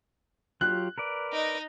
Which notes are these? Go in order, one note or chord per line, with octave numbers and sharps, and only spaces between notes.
F#3 F4 G4 F#6
A#4 B4 D5
D#4 D#5